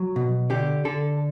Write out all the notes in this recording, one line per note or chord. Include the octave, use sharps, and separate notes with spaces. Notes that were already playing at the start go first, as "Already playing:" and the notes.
Already playing: F#3
B2
D3 G4
D3 A4